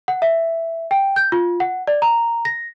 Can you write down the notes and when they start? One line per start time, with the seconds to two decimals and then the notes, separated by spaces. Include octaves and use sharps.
0.08 F#5
0.22 E5
0.91 G5
1.16 G6
1.32 F4
1.60 F#5
1.87 D5
2.02 A#5
2.45 A#6